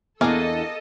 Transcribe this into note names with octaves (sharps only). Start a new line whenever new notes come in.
E2 A#3 B3 D4 G#4 A4 D#5 F5